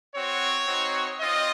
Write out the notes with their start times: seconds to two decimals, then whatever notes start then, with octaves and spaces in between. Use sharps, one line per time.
0.13 C4 F#4 C#5
0.66 C4 D#4 F#4
1.20 C4 F4 D#5